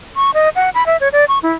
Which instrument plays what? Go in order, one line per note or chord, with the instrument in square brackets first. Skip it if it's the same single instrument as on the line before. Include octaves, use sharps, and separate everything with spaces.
[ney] C#6
D#5
F#5
B5
E5
C#5
D5
C#6
E4